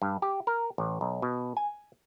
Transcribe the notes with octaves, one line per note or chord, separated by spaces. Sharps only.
G2
G4
A#4
A1
B1
B2
G#5